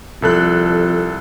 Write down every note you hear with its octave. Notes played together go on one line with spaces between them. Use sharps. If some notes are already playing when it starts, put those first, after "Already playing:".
C2 F2 A4 F#6